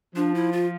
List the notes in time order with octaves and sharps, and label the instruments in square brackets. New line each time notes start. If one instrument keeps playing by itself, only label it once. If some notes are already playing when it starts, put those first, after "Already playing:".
[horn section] F3 [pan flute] D4
[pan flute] E4
F4